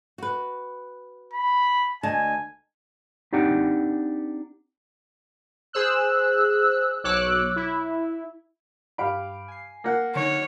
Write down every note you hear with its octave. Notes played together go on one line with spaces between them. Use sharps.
F#4 B4
B5
D2 D#5 G#5 A5
C4 D4 D#4 G4 F#5 G5
G#4 C5 E6 F#6
B1 C#5 D6 E6 F#6
E4
G2 G4 F5 B5 D7
G#5 C7
A#3 F#5
D3 D#4 C#5